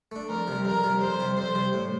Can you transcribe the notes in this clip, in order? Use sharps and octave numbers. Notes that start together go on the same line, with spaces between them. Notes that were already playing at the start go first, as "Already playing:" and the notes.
A3 D4
F2 A#4
C3 G3
F2 A#4
C3 G3
F2 C5
C3 G3
F2 C5
C3 G3
A2